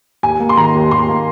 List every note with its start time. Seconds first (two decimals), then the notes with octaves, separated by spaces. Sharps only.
0.23 D#2 G#5
0.40 A#3
0.49 C6
0.57 D#3 A#5
0.75 D#2
0.91 D#2 C6
1.09 A#3